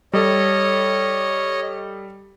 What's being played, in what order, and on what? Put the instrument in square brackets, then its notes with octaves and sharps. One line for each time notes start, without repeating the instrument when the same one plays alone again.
[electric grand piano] G3 A4 [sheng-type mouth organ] C#5 D#5